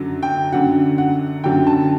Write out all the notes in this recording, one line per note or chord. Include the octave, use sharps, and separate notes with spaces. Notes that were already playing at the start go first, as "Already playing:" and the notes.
Already playing: F#2 D3 F#3
G5
F#2 D3 F#3 F#5
F#5
F#2 D3 F#3 G5
A5